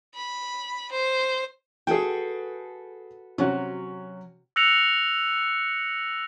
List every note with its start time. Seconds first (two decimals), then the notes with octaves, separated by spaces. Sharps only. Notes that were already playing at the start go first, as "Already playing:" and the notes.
0.15 B5
0.91 C5
1.87 F#4 G#4 A4 B4 G5
3.38 C3 F#3 C#4 F#4
4.56 E6 F#6 A#6 C#7 F7 F#7